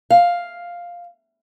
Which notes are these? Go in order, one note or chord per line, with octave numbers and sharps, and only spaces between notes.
F5